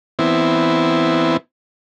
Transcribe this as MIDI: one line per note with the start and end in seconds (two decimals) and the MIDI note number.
0.19 1.37 52
0.19 1.37 59
0.19 1.37 60
0.19 1.37 64